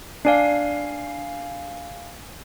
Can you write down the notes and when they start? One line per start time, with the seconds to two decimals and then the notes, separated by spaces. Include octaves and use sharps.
0.25 D4 D5 F5 G#5 C7